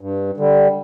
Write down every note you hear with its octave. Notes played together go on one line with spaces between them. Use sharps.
G2
D3 G3